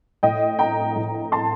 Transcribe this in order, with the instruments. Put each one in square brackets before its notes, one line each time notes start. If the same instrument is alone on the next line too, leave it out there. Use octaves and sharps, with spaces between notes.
[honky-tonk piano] A2 D#5 G5
G5 A#5
A2
A5 C6